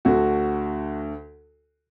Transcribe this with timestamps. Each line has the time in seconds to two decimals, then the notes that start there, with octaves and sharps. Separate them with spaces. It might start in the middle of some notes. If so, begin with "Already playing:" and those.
0.05 D2 D3 F#4